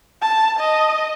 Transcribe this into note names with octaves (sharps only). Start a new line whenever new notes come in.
A5
D#5